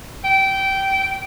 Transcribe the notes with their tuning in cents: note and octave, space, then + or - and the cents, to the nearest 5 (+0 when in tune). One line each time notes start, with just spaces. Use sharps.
G5 -15